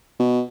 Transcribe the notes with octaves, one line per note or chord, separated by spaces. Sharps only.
B2